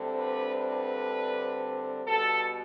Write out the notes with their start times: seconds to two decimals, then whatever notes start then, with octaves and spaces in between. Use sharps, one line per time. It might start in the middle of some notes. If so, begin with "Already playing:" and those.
Already playing: D2 D3 G3 C4
0.17 B4
0.54 B4
2.05 B2 G3 B3 A4